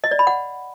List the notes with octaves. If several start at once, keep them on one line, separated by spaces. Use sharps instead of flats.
D#5
D5
B5
F#5